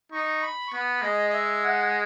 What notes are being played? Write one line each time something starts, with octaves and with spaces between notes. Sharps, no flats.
D#4 C#6
B5
C#6
B3 B5
G#3 D#5
D#5
E5
F#5